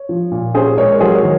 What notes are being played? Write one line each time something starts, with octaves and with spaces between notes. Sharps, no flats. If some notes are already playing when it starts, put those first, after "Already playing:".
Already playing: C#5
F3
A#2
C#4 G#4 C5
G#3 A#4 C#5
F#3 G#4 C5
A#4 C#5
D#3